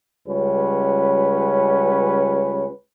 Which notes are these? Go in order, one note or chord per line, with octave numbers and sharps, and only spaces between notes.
C#2 G3 C#4 B4